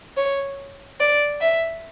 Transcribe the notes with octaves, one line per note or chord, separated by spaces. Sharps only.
C#5
D5
E5